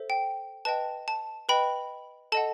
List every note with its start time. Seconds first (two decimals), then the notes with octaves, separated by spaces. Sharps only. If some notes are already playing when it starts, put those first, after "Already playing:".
Already playing: A4 C5 E5
0.10 G5
0.65 B4 D#5 G5 A5
1.08 A5
1.49 B4 D#5 G5 B5
2.32 A4 D#5 F#5 A5